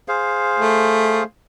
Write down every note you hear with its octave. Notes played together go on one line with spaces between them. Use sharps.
G#4 C5 F5
A3